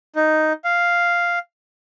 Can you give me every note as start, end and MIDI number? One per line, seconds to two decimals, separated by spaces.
0.16 0.53 63
0.64 1.39 77